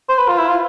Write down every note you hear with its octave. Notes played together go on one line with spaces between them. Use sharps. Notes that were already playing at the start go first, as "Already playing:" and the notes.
C5
B4
F4
E4
F4